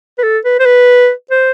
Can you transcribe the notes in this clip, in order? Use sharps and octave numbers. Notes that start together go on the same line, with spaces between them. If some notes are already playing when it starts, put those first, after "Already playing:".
B4
A4
B4
C5
B4
C5